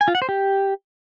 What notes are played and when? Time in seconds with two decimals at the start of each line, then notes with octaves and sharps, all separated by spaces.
0.01 G#5
0.08 F4
0.15 F#5
0.22 C5
0.29 G4